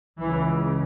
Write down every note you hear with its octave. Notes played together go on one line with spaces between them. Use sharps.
C#2 C#3 E3